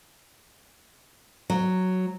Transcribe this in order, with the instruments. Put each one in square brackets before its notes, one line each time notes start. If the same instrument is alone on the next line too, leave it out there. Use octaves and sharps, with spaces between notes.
[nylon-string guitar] F#3